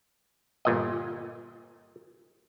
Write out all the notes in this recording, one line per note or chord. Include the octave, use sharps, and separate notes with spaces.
G1 A#2 D#5